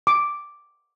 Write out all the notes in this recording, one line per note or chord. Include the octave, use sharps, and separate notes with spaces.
D6